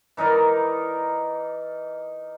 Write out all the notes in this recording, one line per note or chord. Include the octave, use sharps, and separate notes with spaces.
E3 D#4 A#4 D5